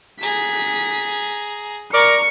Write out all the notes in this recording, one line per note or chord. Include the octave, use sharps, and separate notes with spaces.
G#4 A#5 B6
A#4 D5 A#5 C#6 C#7